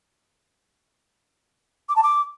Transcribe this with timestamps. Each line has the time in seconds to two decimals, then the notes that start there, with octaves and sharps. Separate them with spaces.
1.89 D6
1.96 A5
2.03 D6